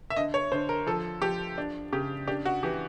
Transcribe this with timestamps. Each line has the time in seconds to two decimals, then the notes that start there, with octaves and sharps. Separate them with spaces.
0.10 E5
0.16 D3 D#5
0.34 C#5
0.52 D3 C5
0.69 A#4
0.87 F3 A4
1.22 F3 G4
1.58 D4
1.93 C#3 G4
2.27 D4 G4
2.46 F#4
2.63 E3 G4